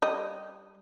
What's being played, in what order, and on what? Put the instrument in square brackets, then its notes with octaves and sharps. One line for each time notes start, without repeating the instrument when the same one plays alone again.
[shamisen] G3 D#5